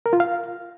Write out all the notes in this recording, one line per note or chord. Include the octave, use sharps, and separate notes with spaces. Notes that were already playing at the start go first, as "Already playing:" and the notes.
A#4
F4
F5